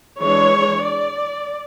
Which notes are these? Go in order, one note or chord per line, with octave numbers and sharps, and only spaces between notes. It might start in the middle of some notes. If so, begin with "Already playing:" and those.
E3 G#3 D4 C#5
D5